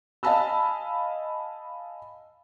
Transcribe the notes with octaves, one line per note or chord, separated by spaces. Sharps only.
D#5 F5 G#5 A5 B5 E6